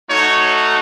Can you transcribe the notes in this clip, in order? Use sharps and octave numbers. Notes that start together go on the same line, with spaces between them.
A3 D#4 F#4 C#5